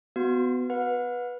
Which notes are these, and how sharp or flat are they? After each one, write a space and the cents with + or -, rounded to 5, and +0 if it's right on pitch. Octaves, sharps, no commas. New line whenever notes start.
B3 +20 F#4 +0
B4 -10 F#5 -35